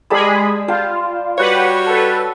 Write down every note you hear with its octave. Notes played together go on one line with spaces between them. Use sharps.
G3 G#3 G#4 A5 B5
F4 F5 G5 A5
G3 F#4 G4 B4 C#5 F#5
A4 B4